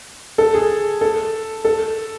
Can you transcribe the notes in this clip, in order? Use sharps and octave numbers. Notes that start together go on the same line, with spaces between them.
A4
G#4
A4
A4